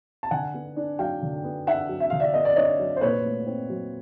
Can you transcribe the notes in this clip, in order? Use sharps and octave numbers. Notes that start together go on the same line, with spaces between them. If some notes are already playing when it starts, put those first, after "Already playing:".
A5
D3 F#5 G#5
B3
D4
F#3 F5 G5
D3
B3
D4 E5 F#5
F#3
E5
D3 F5
D5 E5
B3 D#5
D5
D4 C#5 D#5
F#3
C5
A#2 B4 C#5
A3
C4
F#3